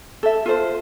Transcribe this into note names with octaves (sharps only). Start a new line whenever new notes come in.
A4 E5
F4 A4 C5